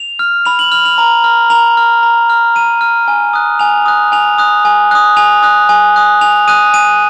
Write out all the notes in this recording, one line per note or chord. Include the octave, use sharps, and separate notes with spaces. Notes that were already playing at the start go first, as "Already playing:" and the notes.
Already playing: F7
F6
B5 F7
F#7
F6 F7
F7
A#5
F6
A#5 F7
F6
A#5
F6
A#5 D#7
F6
G#5
D#6 F#6
G#5 F7
D#6 F#6
G#5 F7
D#6 F#6
G#5
D#6 F#6
G#5 F7
D#6 F#6
G#5
D#6 F#6
G#5 F7
D#6 F#6 D#7
G#5 D#7